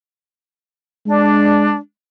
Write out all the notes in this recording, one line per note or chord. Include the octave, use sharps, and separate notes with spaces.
G#3 D4